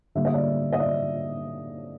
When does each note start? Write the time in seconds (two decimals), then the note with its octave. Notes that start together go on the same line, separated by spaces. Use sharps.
0.15 D3 G3 A#3 E5
0.25 D#5
0.34 D5 E5
0.73 D#5
0.79 D5 E5